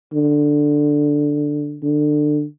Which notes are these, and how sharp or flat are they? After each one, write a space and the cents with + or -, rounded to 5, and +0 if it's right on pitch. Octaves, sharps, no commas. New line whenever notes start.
D3 +5
D3 +25